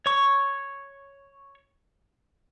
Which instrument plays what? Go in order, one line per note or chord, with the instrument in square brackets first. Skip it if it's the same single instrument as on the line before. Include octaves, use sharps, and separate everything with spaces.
[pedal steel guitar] C#5 C#6